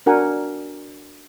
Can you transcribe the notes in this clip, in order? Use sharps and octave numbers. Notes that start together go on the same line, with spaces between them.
D4 F#4 A#4 F#5 G#5